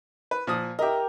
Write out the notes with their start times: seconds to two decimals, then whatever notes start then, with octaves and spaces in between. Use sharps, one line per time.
0.31 B4
0.47 A#2 F3 D#6
0.79 G4 A#4 D#5 E5